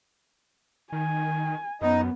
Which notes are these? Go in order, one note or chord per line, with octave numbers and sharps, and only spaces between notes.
D#3 G#5
F#2 B3 D#4